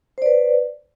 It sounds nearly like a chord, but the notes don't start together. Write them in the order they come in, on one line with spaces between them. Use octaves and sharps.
C5 D5 B4